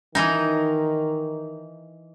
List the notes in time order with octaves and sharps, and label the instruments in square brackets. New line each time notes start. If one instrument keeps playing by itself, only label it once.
[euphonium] D#3 [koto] E3 D#4